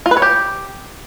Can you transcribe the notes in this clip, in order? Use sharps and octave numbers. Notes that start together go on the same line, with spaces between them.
F4
B4
C#5
G4